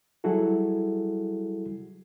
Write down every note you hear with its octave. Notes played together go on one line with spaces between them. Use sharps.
F#3 G3 E4 F#4 G#4 A4